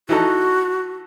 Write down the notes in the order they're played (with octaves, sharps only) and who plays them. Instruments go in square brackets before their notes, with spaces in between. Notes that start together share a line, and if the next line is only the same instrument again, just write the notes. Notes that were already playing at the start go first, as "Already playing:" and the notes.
[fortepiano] E3 D#4 A4 [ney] F#4